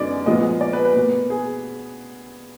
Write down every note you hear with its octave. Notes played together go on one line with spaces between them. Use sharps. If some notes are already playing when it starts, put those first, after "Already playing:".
Already playing: F#2 D3 G#3 B3 D#4 D5
A#2 F3 G#3 B3 D#5
D5
B4
B4
B2 A#3
G#4